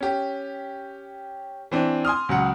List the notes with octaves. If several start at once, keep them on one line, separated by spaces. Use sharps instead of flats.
C#4 G4
E3 C4 D4
G#5 C6 D#6 F6
C#2 F#3 F#5